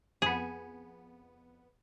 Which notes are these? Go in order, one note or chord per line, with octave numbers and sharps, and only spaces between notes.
F2 B3 G#4